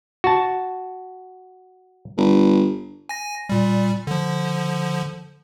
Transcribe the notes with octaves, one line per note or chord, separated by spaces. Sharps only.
F#4 A5
G1
G#5 A#6
A#2 G3
D3 F3